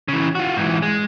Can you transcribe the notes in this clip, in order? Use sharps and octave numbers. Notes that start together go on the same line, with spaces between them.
C#3 E3
F4 F#4
G#2 E3
G#3